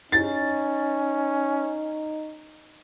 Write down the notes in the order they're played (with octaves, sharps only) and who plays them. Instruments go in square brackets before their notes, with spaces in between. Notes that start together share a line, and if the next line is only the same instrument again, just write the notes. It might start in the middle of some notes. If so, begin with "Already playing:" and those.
[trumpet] C#4 [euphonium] D#4 [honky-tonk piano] A6